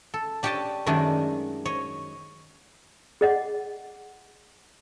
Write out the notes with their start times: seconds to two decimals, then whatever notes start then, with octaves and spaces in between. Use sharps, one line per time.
0.14 A4
0.43 D4 G4 C#5 D#5 G5 A5
0.86 F#2 D#3 G#3 A3 D4 G#4
1.66 C#5 D#5
3.21 G#4 D#5 F#5